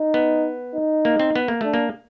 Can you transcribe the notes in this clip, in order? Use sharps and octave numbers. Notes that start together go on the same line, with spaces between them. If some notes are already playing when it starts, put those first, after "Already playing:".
Already playing: D#4
B3
D#4
A#3
C4
B3
A#3
A3 D4
A#3